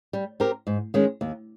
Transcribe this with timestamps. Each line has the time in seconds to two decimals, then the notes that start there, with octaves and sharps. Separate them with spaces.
0.13 G3
0.40 C4 G4 A#4
0.67 G#2
0.94 D#3 G#3 C#4
1.21 D#2